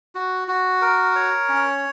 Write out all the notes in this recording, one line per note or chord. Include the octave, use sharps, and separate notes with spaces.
F#4
F#4
A#4
C#5
C#4